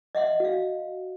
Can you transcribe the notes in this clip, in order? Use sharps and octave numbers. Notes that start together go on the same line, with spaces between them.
D#5 E5 F#5 C6
F#4 F5